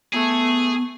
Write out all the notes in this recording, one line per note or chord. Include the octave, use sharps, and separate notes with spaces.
A3 B3 G#4